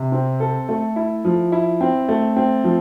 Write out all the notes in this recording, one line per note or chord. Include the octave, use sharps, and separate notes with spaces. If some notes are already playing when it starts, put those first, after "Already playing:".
Already playing: C3
C4
A4
A3
E4
F3
E4
C4
A3
C4
F3